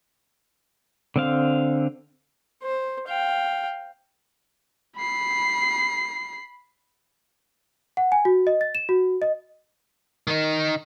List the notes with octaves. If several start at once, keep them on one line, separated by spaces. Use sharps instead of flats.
D3 C4 F5
C5
F5 G5
B5 C7
F#5
G#5
F#4
D#5
A6
E7
F#4
D#5
D#3 D#4